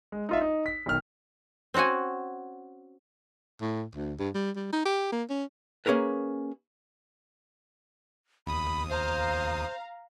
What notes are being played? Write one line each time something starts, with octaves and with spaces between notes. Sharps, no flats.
G#3
D#4 F4 E5
D#4
B6
B1 D#3 F6
C4 C#4 F#4 F#5 G#5
A2
D2
G2
G3
G3
D#4
G4
A#3
C#4
A#3 C#4 G#4 A#4 B4
D#2 B5 D#6
C5 F5 A#5